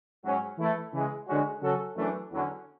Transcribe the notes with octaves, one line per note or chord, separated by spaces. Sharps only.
G#2 F#3 C#4
E3 A3 E4 A4
C#3 E3 G#3
D3 G#3 C#4 F#4
C#3 F#3 C#4 F#4 A4
F#2 E3 A3 D4
E2 D3 F#3 C#4